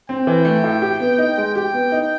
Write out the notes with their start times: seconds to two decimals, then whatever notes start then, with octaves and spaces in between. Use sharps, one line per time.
0.09 C4 G5
0.27 E3
0.45 A3
0.64 A2
0.82 G4
1.00 B3
1.18 D#4
1.38 G#3
1.55 G4 G5
1.74 B3
1.92 D#4